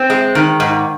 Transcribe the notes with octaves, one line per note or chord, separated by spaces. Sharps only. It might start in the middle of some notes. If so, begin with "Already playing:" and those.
Already playing: C4
G#3
D#3
G#2